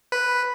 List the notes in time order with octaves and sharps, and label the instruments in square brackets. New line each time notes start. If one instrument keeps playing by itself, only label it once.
[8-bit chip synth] B4